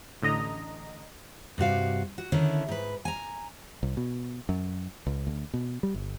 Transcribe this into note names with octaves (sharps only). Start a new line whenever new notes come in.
A1 D3 D#5 A#5
G2 C3 F#4 F5
F#4
D3 D#3 C#4 E4
G#2 B4
G#5 A#5
C2
B2
F#2
C#2
D2
B2
G3
G1